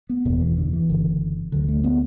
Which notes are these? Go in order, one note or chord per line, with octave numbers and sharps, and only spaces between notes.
B3
F#1 E2 B2 B3
E3
D3
E3
F#1 F#2 D3
D2 D3 F#3
A3
B3